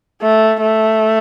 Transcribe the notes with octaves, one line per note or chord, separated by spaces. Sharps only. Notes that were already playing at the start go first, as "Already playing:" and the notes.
A3
A3